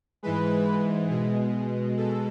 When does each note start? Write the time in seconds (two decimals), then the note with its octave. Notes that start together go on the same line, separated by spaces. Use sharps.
0.23 G#2 E3 G#3 B4
1.10 B2 G#3
1.97 B2 G#3 A4